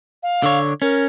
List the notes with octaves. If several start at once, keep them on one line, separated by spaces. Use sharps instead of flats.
F5
D3 C#5
C#4 A#4